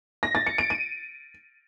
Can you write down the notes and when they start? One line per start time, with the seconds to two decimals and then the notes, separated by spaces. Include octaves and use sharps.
0.23 A#6
0.35 A6
0.47 C#7
0.58 D7
0.70 D#7